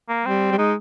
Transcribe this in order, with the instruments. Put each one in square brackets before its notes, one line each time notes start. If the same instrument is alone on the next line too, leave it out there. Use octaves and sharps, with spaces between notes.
[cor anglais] A#3
[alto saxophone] G3 [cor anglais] C4
[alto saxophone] G3
[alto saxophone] G#3 [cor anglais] D#4